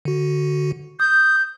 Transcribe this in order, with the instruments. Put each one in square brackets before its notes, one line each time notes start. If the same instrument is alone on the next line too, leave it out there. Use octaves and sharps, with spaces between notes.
[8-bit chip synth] D3 F#4
[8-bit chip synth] D#6 [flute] G6